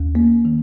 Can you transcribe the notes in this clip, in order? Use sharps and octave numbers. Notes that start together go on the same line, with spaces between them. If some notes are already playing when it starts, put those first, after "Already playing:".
Already playing: D#2
A#3
D#3